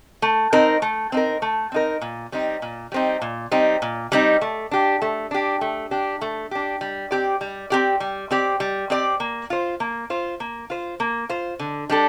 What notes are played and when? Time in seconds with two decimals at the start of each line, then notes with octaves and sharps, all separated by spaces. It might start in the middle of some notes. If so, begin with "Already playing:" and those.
0.22 A3
0.53 C4 D#4 A#4
0.82 A3
1.12 C4 D#4 A#4
1.42 A3
1.72 C4 D#4 A#4
2.02 A#2
2.32 G3 C4 D#4
2.62 A#2
2.92 G3 C4 D#4
3.22 A#2
3.51 G3 C4 D#4
3.82 A#2
4.12 G3 C4 D#4
4.41 A3
4.71 D4 G4
5.02 A3
5.31 D4 G4
5.61 A3
5.91 D4 G4
6.21 A3
6.51 D4 G4
6.81 G3
7.11 C4 G4 D5
7.41 G3
7.70 C4 G4 D5
8.00 G3
8.31 C4 G4 D5
8.60 G3
8.90 C4 G4 D5
9.20 A#3
9.50 F4 C5
9.80 A#3
10.10 F4 C5
10.40 A#3
10.70 F4 C5
11.00 A#3
11.29 F4 C5
11.59 D3
11.89 G3 D4 A4